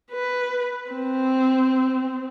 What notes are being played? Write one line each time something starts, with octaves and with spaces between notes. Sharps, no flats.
B4
C4